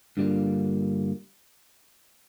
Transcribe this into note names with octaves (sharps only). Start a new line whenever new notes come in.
G2 D3 G3 A#3 F4